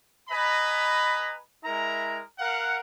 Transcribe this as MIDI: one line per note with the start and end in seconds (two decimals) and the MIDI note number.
0.29 1.33 71
0.29 1.33 75
0.29 1.33 80
0.29 1.33 82
0.29 1.33 83
1.64 2.19 56
1.64 2.19 64
1.64 2.19 70
1.64 2.19 82
2.39 2.80 70
2.39 2.80 77
2.39 2.80 78